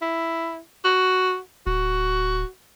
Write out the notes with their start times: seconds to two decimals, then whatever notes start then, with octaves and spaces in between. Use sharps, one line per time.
0.02 E4
0.84 F#4
1.67 D1 F#4